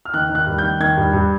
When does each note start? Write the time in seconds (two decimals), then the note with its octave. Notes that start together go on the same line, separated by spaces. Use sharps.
0.05 F6
0.14 D#3 F#6
0.29 D#3
0.35 F#6
0.47 G2
0.58 D#3 G6
0.80 D#3 G#6
0.97 G2
1.13 G2